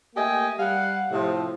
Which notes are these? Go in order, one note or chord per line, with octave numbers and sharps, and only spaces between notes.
A3 A#3 G4 D#5 G5 G#5
G3 F5 F#5
A2 C3 F3